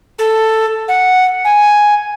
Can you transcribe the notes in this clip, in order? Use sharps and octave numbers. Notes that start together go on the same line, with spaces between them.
A4
F#5
G#5